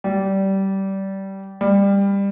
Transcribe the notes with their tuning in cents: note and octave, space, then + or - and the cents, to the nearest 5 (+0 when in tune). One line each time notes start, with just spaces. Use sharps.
G3 -20
G3 +20